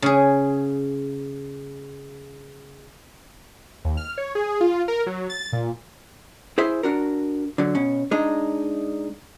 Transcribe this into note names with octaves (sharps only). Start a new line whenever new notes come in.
C#3 G#4
D#2
F6
C#5
G#4
F4
A#4
F#3
A6
A#2
E4 G#4 C5 E5
D4 F#4 A#4
D3 F#3
B2 C#4
G#3 D4 D#4